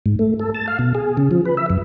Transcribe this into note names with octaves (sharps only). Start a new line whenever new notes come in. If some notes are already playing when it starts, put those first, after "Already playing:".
G#2
A3
A4
A5
F5
B2
G#4
C#3
F3
B4
E5
F#2